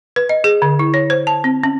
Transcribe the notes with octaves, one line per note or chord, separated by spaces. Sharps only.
B4
D#5
G#4
D3
E4
C#5
C5
A5
C4
C#4